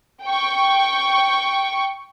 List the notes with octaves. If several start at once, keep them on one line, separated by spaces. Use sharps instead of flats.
G5 C#6